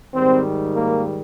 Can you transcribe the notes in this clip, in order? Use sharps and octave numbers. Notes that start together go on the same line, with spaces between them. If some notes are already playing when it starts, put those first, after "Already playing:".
G#2 D#3 G3 C4
A#3